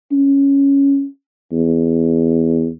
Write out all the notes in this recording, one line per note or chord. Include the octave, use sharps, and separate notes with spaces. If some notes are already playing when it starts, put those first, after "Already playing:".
C#4
E2